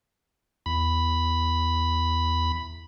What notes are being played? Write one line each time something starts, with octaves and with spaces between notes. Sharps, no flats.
E2 B5